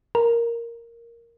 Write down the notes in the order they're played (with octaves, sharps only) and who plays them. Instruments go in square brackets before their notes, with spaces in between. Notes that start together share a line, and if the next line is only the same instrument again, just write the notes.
[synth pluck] A#4